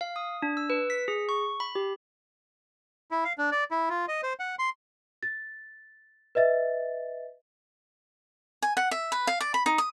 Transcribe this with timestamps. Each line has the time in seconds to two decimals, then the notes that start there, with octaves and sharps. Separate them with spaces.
0.01 F5
0.16 D#6
0.42 D4
0.57 E6
0.70 B4
0.90 B6
1.08 G#4
1.29 C#6
1.60 B5
1.75 G4
3.11 E4
3.25 F5
3.38 D4
3.52 D5
3.71 E4
3.89 F4
4.08 D#5
4.23 C5
4.39 F#5
4.59 C6
5.23 A6
6.35 B4 D#5 E5 A6
8.62 G#5
8.77 F#5
8.91 E5
9.12 B4
9.27 F5
9.41 D5
9.54 B5
9.66 D#4
9.78 D#6